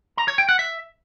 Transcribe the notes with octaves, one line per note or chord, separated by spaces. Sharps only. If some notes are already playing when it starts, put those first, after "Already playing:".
A#5
C#5
G5
F#5
E5